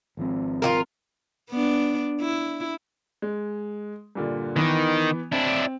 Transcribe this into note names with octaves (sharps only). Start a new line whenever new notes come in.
G#1 F3 C4
F4 F#4 A#4
B3 D4
E4
G#3
G2 A#2 D3
D#3 E3 B3
C4 D4 E4